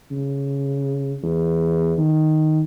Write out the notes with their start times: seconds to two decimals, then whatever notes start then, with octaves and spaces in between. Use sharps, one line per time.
0.11 C#3
1.23 E2
1.98 D#3